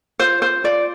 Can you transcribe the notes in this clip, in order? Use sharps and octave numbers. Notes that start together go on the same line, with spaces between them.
F4 C5
C5
F4 D5